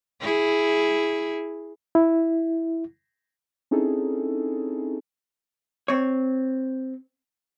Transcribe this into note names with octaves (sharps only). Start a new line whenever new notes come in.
E4 G#4
E4
C4 C#4 D#4 E4 G#4 A4
C4 C#5